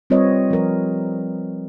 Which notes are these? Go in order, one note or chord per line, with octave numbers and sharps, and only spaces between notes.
G3 C4 F4 B4 C#5 D#5
F3 A#4